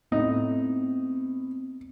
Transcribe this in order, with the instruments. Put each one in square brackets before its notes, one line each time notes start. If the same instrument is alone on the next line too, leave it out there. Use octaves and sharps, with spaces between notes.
[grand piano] A2 [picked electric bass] B3 C4 [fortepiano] D#4